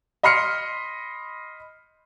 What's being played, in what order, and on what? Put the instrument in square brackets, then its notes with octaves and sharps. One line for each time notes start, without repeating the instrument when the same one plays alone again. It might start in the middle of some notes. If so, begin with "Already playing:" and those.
[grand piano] D#5 B5 C6 F6 C7 C#7